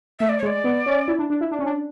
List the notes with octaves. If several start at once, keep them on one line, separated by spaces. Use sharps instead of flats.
A3 E5
D5
C#5
G#3 D5
B3
C#4
E4
D4
D4
E4
D4
C#4
D4